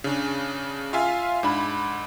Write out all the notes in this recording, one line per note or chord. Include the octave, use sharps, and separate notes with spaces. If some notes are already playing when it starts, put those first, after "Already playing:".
C#3 D4
F4 E5 F5 G#5
G#2 D4 B5